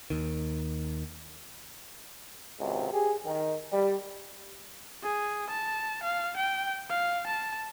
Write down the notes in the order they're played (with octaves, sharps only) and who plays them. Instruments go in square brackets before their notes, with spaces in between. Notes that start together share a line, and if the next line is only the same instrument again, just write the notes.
[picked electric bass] D#2 D#3
[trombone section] G#1 C#2 G#2 C3
G4 G#4
D#3
G3
[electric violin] G#4
A5
F5
G5
F5
A5